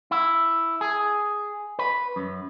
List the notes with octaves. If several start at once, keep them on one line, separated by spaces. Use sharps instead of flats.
E4
G#4
B4
F#2